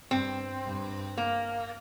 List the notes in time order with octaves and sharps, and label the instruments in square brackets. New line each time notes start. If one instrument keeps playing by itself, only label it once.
[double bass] G2 [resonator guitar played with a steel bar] C4
[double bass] G2
[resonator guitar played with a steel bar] A#3